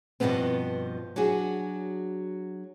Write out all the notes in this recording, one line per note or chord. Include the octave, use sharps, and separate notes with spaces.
G2 B2 D3 F3 B3 C4
F#3 D4 F#4 G#4